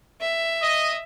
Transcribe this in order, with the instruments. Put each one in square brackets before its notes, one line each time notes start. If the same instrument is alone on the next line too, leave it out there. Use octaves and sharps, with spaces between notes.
[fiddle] E5
[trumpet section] D#5